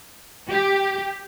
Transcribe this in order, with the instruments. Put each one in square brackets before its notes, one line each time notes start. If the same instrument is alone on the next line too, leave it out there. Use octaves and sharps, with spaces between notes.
[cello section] G4